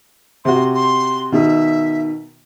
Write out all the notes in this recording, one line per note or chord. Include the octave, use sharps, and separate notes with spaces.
C3 F#4 C6
C6
B2 D#3 E5